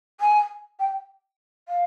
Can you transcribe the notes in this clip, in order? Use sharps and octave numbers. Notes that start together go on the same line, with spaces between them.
G#5
G5
F5